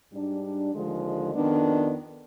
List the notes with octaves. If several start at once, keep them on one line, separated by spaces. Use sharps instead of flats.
G#2 G3 D4
D#2 D3 F3 G#3
F2 D#3 B3 D4